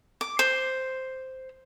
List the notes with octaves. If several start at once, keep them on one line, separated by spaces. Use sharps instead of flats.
D6
C5